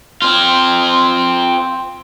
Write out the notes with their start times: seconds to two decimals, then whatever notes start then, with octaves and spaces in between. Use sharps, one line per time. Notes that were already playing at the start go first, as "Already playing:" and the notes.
0.22 C4 F4